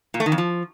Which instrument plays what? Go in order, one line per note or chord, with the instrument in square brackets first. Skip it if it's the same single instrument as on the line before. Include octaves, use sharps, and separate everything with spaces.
[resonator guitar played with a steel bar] A#2
A3
D#3
F2
F3